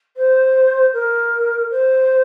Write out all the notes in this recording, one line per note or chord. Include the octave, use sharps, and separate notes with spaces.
C5
A#4
C5